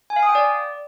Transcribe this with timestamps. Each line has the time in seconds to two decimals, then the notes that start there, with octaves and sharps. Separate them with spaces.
0.10 G#5
0.16 F5
0.23 D#6
0.29 G5
0.35 D5